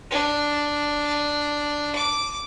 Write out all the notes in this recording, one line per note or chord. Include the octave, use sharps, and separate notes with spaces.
D4
D6